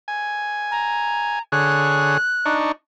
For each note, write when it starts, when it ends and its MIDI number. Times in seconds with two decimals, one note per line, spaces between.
0.08 1.39 80
0.71 1.41 82
1.52 2.17 50
1.52 2.17 68
1.52 2.17 73
1.52 2.55 90
2.45 2.72 62
2.45 2.72 63
2.45 2.72 85